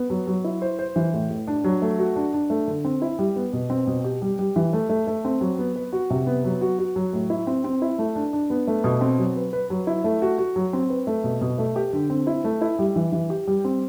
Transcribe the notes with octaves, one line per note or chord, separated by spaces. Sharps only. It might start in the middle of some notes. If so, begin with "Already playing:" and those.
Already playing: B3
F#3
F#3
E4
C5
C5
E3
A2
A2
D4
F#3
A3
F#4
D4
D4
A3
D3
C4
E4
G3
B3
B2
C4
B2
G4
G3
G3
E3
A3
A3
A3
C4
F#3
B3
B4
F#4
C3
B3
F#3
F#4
F#4
F#3
A2
E4
C4
C4
E4
A3
D4
D4
B3
A3
B2
C4
F#3
B4
B4
F#3
E4
A3
F#4
F#4
F#3
C4
B4
A3
B2
B2
A3
G4
D3
C4
E4
A3
E4
G3
E3
E3
G4
G3
C4